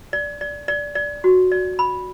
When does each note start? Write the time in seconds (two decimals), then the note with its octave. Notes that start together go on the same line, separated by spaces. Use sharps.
0.13 D5
0.41 D5
0.68 D5
0.95 D5
1.24 F#4
1.52 D5
1.79 B5